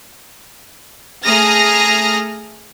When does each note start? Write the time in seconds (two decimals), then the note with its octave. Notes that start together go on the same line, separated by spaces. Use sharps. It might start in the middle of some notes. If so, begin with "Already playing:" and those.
1.23 A3 G#4 A#5 D#6 F6 A#6